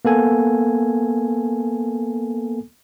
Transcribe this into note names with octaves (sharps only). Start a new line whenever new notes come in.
A#3 B3 A4 G#5